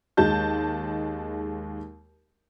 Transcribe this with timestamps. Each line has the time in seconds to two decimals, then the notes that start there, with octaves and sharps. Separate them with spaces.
0.17 D#2 G#3 A5 G6